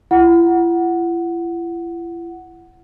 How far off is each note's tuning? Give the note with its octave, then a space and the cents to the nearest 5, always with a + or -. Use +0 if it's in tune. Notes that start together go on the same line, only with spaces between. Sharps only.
E4 +45 F#5 +0